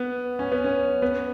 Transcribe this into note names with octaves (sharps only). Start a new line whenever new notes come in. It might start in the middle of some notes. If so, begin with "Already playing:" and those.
Already playing: B3
C#4
B3
C#4
B3